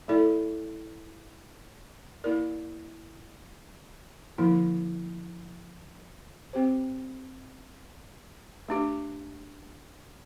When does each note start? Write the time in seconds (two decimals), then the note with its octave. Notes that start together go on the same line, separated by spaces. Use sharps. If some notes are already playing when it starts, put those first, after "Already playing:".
0.08 A3 E4 A4 D5
2.24 A#3 E4 A#4 D5
4.38 D3 F3 A#3 E4
6.53 C4 G4 C5
8.69 A3 D4 G4